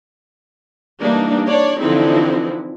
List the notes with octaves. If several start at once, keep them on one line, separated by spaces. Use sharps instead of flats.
E3 G3 A#3 D4 D#4
D4 C#5 D5
D3 E3 F3 C4 D#4 E4